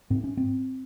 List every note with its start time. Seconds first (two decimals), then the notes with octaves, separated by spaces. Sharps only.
0.10 G#2 C4
0.24 C#4
0.37 C4